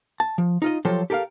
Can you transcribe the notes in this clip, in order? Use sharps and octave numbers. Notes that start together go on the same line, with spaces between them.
A5
F3
D#4 F4 D#5
F3 F#3 F4 G4 A4 C5
G4 A4 A#4 E5 F5